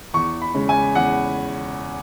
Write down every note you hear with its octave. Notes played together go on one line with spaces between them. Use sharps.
E2 C#6
B5
C#3 G#3 C#4
G#5
E2 F#5